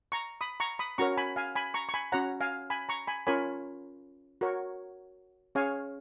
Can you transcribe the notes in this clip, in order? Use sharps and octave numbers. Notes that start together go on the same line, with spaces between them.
A#5 C#6
B5 D#6
A#5 C#6
B5 D#6
C#4 F#4 A#4 C#5 A#5 C#6
G#5 B5
F5 G#5
G#5 B5
A#5 C#6
C#6
G#5 B5
C#4 F#4 C#5 F#5 A#5
F5 G#5
G#5 B5
A#5 C#6
G#5 B5
C#4 F4 A#4 C#5 G#5 B5
F#4 A#4 C#5
C#4 G#4 C#5 F5 G#5